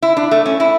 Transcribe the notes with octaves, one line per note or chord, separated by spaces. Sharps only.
E4
D4
A3
C#4
E4